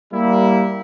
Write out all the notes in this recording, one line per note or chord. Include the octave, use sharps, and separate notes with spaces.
G3 A#3 E4